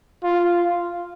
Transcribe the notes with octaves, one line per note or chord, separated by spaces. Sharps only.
F4